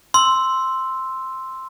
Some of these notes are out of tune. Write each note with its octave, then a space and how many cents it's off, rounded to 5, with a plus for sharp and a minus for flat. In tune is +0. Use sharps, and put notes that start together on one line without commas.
C6 +0 E6 +0